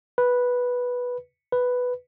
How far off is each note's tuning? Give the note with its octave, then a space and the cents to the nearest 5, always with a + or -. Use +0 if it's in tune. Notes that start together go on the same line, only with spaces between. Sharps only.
B4 -5
B4 +5